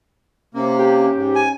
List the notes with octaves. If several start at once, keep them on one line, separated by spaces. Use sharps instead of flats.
C3 A#3 C#4
G4
G#2
G#5